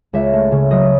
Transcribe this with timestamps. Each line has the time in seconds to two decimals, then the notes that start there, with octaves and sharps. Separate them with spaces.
0.13 C#2 E5
0.33 A3
0.52 C#3
0.71 F#3 D#5